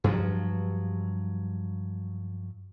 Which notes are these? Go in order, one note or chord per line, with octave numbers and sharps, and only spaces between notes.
G2 F3 F#3